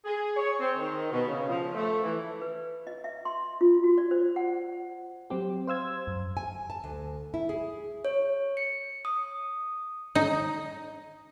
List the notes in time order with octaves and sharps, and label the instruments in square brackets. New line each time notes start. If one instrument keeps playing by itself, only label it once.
[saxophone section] G#4
C#5
C4
D#3
B2
C#3
F3
A3
E3
[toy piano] B4
D#5
E5
C6
F4
F#4
D5
C5
F#5
[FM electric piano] F#3 C4 G4
C5 F5 E6 G#6
F#2
[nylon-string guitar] G#5
A5
D2
E4
G#4
[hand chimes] C#5
C#7
D#6
[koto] D#4